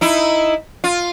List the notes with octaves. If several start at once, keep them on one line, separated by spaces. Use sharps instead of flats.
D#4 E4
F4